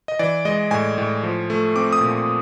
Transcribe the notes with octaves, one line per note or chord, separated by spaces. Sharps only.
D#5
E3 D5
G#3 D#5
A2 G#5
A2
F3
A3
C4 D6
D#6
A#2